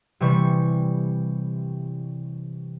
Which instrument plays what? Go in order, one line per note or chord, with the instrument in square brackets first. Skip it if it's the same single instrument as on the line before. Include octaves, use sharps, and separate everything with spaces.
[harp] C3 E3 G3 C#6